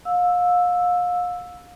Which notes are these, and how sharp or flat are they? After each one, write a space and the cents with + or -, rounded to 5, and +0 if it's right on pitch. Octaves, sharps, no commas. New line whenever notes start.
F5 +35 E6 +0